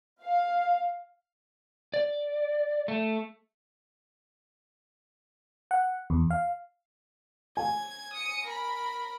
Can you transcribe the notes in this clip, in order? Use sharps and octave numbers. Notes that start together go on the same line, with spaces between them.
F5
D5
A3
F#5
E2
F5
G#5 G#6
D#6 C#7
A#4 B5